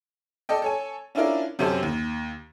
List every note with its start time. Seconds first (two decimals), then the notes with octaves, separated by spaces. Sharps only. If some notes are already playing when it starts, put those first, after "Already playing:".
0.49 A4 D5 D#5 G5
0.62 A4 C#5 G#5
1.15 C#4 D4 E4 F4 A#4 D5
1.59 F#2 C3 C#4 G4 A4 C5
1.83 D#2